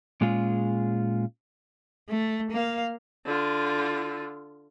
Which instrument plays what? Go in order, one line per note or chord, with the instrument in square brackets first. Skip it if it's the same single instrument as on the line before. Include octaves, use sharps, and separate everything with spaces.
[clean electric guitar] A#2 G#3 C#4 F4 G#4
[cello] A3
A#3 F5
[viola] D3 F4